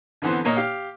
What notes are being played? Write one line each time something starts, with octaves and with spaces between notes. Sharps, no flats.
F2 D3 E3 B3 C4 C5
A#2 A#3 C#5 D#5
G4 F5